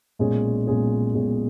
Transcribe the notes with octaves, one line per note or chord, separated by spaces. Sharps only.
B1 A#2 G#3 C#4 G#4
B1 A#2 G#3 C#4 G#4
B1 A#2 G#3 C#4 G#4